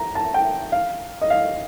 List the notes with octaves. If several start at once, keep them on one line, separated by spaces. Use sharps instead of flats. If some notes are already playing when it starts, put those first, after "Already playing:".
Already playing: A#5
A5
G5
F5
D#5
F5